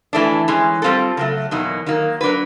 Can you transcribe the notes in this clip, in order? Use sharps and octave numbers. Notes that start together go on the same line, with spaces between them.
A2 E3 A3 D4
E3 G#3 C#4
G3 C4 F4 A4
C#3 F#3 A3
E2 B2 F#3 A#3 D#4
D#3 F#3 A#3
F#3 A#3 D4 F#4 B4